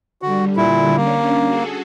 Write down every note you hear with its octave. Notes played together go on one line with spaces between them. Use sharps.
D3 G3 F#4
A#2 E4
A#3 C#4 D4
F#4 G#4 A4